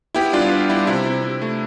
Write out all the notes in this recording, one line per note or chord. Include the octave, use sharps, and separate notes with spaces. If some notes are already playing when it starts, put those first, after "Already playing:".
B3 E4 G4
G3 D4 F4
B3
G3 E4
C3 E4
C3
C3
A3